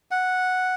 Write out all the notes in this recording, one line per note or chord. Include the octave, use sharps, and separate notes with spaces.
F#5